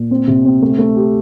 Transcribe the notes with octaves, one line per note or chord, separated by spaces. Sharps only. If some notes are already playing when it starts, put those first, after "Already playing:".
Already playing: A#2
C4
C3
C4
A3
A3
G4